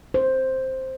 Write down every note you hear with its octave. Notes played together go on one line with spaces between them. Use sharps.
C5